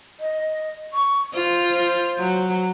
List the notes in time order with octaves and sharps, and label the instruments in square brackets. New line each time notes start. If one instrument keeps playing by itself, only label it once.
[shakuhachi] D#5
C#6
[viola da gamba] F4 [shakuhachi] C5
[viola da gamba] F#3